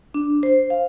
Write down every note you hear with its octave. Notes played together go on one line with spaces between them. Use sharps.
D4
C5
F5